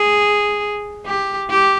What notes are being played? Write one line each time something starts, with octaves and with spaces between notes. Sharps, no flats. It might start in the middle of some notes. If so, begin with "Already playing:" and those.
Already playing: G#4
G4
G4